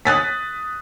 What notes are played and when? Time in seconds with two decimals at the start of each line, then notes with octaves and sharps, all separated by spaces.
0.05 D#6 F#6 A6 B6